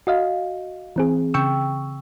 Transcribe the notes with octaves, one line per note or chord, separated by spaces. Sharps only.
F#4 D#5 F5
E3 C4 G#4
C#3 G5 C#6 E6